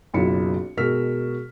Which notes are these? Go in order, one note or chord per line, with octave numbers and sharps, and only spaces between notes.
F#1 B1 E4 F4 C#7
B2 G#3 A#4 E6 F6 B6